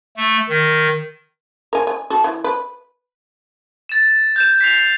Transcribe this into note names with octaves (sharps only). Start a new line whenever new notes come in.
A3
D#3
A#4 G#5
G#5
F#4 A4
E3
B4
A6 E7
G6 E7
B6 C7 F7